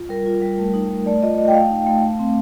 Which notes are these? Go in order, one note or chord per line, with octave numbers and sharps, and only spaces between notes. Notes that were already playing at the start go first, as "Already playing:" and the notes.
Already playing: F4
G3 A#4
F4
G3
A3
D#4
A3
A3 D5
F4 D#5
A3 D#5
G5
A3 F5
D#4
A3
A3
C4